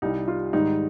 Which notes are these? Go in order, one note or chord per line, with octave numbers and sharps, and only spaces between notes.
C2 C3 G3 D#4
F4
G#2 D#3 G3 D#4